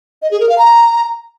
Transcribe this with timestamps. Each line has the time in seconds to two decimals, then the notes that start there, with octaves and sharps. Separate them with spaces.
0.22 D#5
0.31 G#4
0.40 A#4
0.49 F5
0.58 A#5